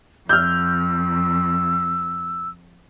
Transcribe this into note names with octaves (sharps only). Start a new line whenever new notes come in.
F2 E6 F6 G6